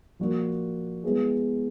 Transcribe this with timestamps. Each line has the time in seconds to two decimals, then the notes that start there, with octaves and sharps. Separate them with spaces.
0.19 A#2 F3 A#3 D4 F#4
1.04 G#3 B3 E4 G#4